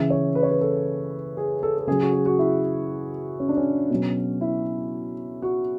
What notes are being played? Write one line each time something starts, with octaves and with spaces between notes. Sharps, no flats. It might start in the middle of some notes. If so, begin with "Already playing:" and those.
Already playing: C#3 E3 E5
C#5
B4
C#5
B4
A4
G#4
A4
A4
C#3 F#3 G#4
F#4
G#4
F#4
E4
C#4
D4
C#4
B2 F#3
E4
F#4